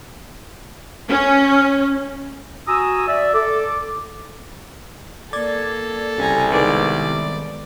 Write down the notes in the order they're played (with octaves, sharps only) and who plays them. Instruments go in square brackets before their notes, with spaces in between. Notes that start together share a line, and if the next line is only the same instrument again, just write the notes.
[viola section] C#4
[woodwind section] F#4 G#5 A#5 D#6 E6
D5 E5
A4 D6
[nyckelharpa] A#3 [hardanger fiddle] A4 [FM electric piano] D5 G#6 A6
[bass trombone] C2 [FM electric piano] C#3 G3 [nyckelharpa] G#5 A#5
[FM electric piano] D#3 G#3 B3 [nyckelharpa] D5